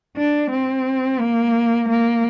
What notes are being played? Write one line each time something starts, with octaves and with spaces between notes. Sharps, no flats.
D4
C4
A#3
A#3